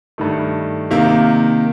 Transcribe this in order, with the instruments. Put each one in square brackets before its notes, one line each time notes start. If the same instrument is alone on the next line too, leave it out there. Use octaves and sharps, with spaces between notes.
[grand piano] G2 D#3 A3
C3 D#3 A#3